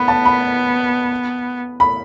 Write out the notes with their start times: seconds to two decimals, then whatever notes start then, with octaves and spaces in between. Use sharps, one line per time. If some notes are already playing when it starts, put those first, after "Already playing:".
Already playing: B3 B5
0.08 A5
0.25 B5
1.80 B5